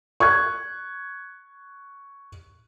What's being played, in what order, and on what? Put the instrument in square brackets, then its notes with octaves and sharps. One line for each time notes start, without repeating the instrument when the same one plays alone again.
[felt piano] C#6 F#6 G#6